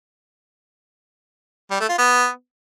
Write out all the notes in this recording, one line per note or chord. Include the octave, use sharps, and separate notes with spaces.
G3
A3
F4
B3